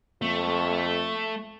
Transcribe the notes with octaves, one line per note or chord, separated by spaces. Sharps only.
F2 A3